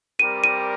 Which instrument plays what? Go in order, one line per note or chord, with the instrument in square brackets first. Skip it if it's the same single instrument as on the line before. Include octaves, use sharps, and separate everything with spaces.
[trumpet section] G3 C4 G4 A#4 D5 [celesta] D#7
[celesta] D#7